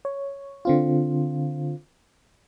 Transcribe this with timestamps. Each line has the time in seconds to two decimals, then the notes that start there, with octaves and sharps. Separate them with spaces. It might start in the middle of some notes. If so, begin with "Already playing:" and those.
0.05 C#5
0.65 D3 C4 F4